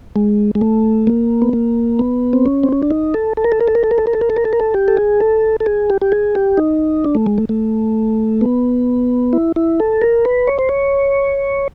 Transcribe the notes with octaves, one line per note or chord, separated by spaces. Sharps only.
G#3
G#3
A3
A#3
B3
A#3
B3
C4
C#4
C4
C#4
D4
D#4
A4
A4
A#4
A4
A#4
A4
A#4
A4
A#4
A4
A#4
A4
A#4
A4
A#4
A4
A#4
A4
G4
A4
G#4
A4
A4
G#4
G4
G4
G#4
G4
D#4
D4
A3
G#3
A3
A3
B3
E4
E4
A4
A#4
B4
C#5
C5
C#5